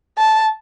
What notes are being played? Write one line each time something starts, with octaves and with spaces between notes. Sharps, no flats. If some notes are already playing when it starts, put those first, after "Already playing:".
A5